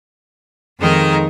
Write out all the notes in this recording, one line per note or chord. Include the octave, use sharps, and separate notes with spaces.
F2 D#3 G#3 D#4 A#4